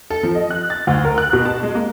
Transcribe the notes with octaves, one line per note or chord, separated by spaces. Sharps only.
A4
F3
D#5
F#6
A6
D2
A#4
F#6
B2
A5
G#3
A#3